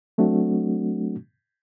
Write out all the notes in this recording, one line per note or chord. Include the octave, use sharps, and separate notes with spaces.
F#3 A3 C4 D4 F#4